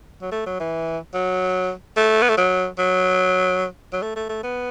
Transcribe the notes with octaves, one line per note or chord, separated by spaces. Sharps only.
F#3
A3
F#3
E3
F#3
A3
B3
A3
F#3
F#3
F#3
A3
A3
A3
B3